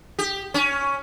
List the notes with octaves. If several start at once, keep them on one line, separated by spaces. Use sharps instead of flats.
G4
C#4